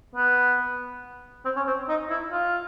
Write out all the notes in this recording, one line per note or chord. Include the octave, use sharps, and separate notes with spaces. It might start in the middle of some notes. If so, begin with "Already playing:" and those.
B3
C4
C#4
C4
D#4
E4
F4